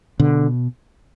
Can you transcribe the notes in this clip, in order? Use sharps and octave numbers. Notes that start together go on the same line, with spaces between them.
B2 D3